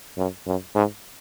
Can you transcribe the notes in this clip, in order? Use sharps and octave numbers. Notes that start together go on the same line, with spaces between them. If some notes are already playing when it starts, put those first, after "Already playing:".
F#2
F#2
G#2